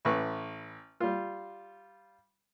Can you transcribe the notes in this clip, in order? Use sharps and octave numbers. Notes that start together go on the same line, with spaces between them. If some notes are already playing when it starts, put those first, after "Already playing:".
A1 B4 B5 C#6
G3 F4